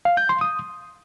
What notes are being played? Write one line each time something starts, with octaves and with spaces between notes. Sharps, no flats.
F5
G6
C6
D#6